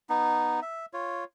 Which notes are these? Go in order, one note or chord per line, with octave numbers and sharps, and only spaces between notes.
B3 D#4
E5
F4 C#5